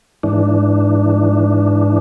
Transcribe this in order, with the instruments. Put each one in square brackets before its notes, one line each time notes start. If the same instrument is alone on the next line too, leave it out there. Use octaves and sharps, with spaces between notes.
[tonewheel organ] G#2 E3 D4